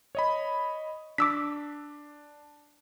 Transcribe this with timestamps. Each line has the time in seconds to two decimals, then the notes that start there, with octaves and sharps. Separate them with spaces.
0.15 C#5 D#5 B5
1.18 D4 D6 E6 B6